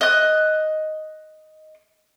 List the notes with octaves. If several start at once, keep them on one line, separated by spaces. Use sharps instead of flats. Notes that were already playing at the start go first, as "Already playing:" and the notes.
D#5 F#6